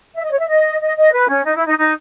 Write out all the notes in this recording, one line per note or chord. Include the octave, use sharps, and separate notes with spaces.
E5
D#5
C#5
E5
D#5
D#5
D#5
B4
C#4
D#4
E4
D#4
D#4